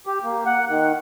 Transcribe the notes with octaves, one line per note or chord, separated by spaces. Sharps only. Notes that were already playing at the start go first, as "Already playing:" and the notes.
G4
A#3
F#5
D#3